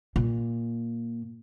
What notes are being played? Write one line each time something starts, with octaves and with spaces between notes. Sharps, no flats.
A#2